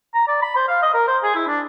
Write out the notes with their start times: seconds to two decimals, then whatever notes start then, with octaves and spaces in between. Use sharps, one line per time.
0.15 A#5
0.28 D5
0.42 B5
0.56 C5
0.68 F5
0.83 D#5
0.94 A#4
1.07 C5
1.23 G#4
1.35 E4
1.48 D4